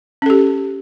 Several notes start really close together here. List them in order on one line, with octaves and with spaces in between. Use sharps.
C#4 A4 G4